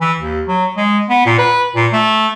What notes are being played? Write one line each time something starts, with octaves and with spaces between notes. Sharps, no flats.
E3
D#2
F#3
G#3
B3
A#2
B4
A#2
A3